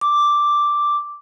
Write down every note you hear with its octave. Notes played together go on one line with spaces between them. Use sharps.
D6